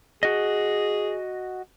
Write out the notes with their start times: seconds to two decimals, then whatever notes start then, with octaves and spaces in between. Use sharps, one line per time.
0.23 F#4 G#4 D#5